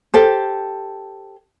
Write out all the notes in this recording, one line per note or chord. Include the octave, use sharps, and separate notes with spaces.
G4 A4 C5